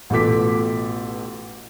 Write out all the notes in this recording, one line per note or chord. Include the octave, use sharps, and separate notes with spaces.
A1 B2 F4 A4 D6 B6